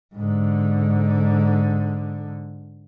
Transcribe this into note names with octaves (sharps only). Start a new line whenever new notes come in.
G#2 D3